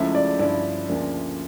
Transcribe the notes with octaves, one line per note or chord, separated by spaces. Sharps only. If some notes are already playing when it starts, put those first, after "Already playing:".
Already playing: C#2 C#3 F3 A3 E4 E5
D5
G2 D3 F3 C#4 E4 D5
D2 C#3 F3 A#3 D4